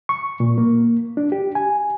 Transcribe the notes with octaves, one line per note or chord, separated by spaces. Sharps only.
C#6
A#2
A#3
D4
G4
G#5